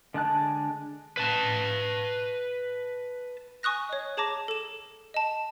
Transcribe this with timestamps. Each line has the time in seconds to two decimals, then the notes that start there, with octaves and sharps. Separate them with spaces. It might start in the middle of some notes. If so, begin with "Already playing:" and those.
0.14 D3 G#3 A5 F#6
1.17 B4 A5
3.63 G#5 C#6 D#6 F#6 A#6
3.89 C#5 D#5
4.17 G#4 C#5 A5 A#5 D6 A#6
4.48 A4 E7
5.14 D#5 A5